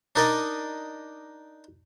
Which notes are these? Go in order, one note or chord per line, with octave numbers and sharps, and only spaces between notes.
D4 D#4 A#4 D5 D#5